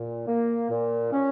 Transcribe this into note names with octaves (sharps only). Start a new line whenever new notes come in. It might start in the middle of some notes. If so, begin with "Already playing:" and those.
Already playing: A#2
A#3
A#2
C#4